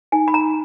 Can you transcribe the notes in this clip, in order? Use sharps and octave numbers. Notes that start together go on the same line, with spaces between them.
D#4 G#5
B5
A#5